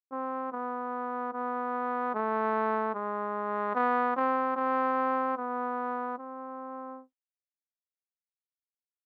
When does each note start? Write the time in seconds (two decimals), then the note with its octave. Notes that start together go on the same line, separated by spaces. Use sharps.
0.12 C4
0.52 B3
1.33 B3
2.14 A3
2.94 G#3
3.75 B3
4.16 C4
4.56 C4
5.37 B3
6.18 C4